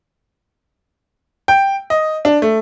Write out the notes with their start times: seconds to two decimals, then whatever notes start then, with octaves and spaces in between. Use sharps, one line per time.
1.48 G5
1.90 D#5
2.25 D4
2.42 A3